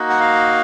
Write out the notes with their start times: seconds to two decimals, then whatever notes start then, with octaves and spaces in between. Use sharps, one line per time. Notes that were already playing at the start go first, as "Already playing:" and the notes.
Already playing: A#3 D#4 F#4
0.10 F#5
0.20 F5